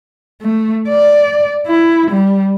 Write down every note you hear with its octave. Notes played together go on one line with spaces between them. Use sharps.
A3
D5
E4
G3